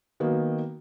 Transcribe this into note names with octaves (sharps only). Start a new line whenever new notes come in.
D#3 F#3 A#3 B3